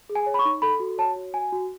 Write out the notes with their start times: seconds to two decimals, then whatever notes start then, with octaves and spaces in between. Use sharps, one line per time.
0.10 G#4
0.15 G#5
0.26 C#5
0.34 B5
0.39 C#6
0.45 D#4
0.62 A4 B5
0.80 F#4
0.98 C#5 A5
1.16 F#4
1.33 F#4 G#5
1.52 F#4